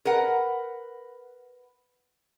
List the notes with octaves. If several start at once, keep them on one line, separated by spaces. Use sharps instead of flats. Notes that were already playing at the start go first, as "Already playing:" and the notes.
A#4 B4 F#5